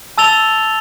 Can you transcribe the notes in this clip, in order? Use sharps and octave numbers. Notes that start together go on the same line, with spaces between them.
A5 E6 A6 F7 G7